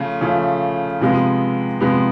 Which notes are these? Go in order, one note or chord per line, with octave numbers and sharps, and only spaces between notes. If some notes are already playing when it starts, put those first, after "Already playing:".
Already playing: C#3 F3 A3
C#3 F3 A3
C3 F3 G#3 B3
C3 F3 G#3 B3